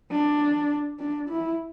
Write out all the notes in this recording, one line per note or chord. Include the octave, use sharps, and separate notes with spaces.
D4
D4
E4